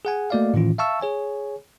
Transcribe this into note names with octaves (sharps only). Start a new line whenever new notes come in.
G#4 F#5 G#5
A3 A#3 F#4 D5 D#5 F5
A2 D#3 E3 C#4 F4
E5 F5 A5 C#6 E6
G#4 C#5 G#5